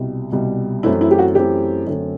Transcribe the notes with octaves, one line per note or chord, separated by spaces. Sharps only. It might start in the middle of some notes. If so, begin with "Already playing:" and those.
Already playing: C2 B2 G3
C2 B2 G3
F#2 E3 A3 C4 E4
E4
G4
F#4
F#2 E3 A3 C4 G4
F#2 D3 A3 C4